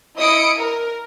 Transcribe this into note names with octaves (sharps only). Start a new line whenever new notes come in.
E4 D#5 D#6 C#7 D7
A#4